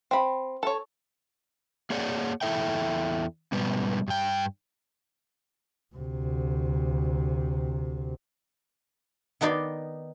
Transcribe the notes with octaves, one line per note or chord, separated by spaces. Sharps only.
C4 B5
A4 C#5
A#3 G#4 C#5 D5 F#5
E2 G3 E4 A4 E5 G5
G#2 B2 G3 B3
G2 G5
D2 C3
D#3 B3 D#4 D5 C6